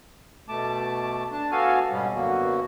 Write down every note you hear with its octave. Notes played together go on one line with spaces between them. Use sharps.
B2 A3 A5 D6
D4 A5
B3 F#4 A4 F5 G#5
G#2 B2 G3 B3 C#4
F#2 D3 A#3 B3 F#4